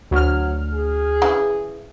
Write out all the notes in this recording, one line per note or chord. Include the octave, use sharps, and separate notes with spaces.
D2 F#3 F6
G#4
C#3 E3